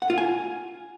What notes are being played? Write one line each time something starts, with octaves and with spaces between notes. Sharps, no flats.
F#5
F4
G#5